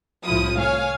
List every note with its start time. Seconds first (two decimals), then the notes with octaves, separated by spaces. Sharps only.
0.24 C2 A2 F3 E4 D#6
0.57 C#5 F5 G#5